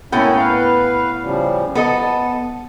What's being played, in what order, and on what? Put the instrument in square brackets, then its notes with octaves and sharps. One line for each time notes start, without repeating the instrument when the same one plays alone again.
[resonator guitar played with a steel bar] A2 B3 G5 [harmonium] A#3 C#4 E4
[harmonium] B4 F5
C#3 F3 G3
[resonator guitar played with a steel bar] B3 A4 D#5 [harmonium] A5